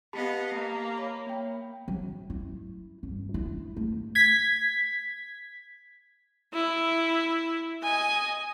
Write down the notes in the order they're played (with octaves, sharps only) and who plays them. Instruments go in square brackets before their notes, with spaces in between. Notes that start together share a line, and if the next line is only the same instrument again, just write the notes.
[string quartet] B3 D#5 F5 [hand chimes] G4 A5 B5
[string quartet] A#3
[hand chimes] C#5 B5
A#3 G5
[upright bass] F#3
E4
G2
E4
A3
[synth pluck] G#6 B6
[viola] E4
D#5 G#5